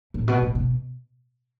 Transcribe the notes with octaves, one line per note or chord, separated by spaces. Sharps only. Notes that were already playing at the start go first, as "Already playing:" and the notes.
A2
B2
A2
B2